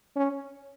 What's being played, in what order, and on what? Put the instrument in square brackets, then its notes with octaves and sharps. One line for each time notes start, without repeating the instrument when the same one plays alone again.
[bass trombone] C#4